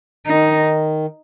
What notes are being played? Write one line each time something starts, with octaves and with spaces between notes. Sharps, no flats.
D#3 D#4